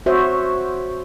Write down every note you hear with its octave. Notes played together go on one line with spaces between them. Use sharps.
F#4 C5 C#5 E5